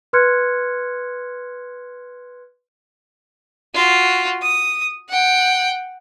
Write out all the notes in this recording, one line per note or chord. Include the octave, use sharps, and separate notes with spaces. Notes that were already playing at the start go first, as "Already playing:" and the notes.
B4 C6 F6 F#6 G#6 C#7
F4 F#4
D#6
F#5 G5